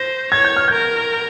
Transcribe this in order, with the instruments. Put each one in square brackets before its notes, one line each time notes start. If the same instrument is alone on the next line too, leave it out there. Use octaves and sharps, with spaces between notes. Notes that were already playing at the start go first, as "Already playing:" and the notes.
Already playing: [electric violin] C5 [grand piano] A#6
[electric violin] C#5 [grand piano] G#6
[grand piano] G6
F6
[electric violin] A#4 [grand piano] G6